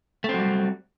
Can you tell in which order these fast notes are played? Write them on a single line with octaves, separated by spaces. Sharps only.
A3 C4 F#3 G3